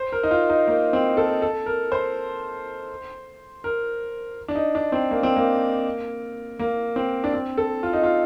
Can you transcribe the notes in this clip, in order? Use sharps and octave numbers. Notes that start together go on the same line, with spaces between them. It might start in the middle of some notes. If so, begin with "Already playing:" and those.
Already playing: C5
A#4
D#4
F4
D#4
A#3
C4
A4
A4
A#4
C5
A#4
D4
D#4
D4
C4
A#3
C4
A#3
A#3
C4
D4
C4
A4
F4
D#4
F4